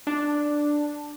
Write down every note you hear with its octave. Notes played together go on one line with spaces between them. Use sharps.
D4